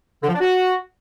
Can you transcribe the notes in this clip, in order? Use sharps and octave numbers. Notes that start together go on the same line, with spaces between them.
D3
F3
D4
F#4